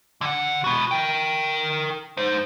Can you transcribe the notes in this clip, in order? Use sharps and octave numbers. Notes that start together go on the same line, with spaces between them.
D3 F#5
E4 F#4
A#4 G5
D#4 C5